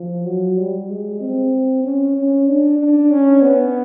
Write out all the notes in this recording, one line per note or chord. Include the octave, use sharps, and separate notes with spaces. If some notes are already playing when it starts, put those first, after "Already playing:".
Already playing: F3
F#3
G3
G#3
C4
C#4
C#4
D4
D4
C#4
B3